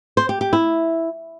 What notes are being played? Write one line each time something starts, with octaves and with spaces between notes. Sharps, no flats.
C5
G4
G4
E4